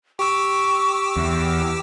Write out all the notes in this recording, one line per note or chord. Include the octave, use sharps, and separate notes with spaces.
G4 C#6 D6 E6
E2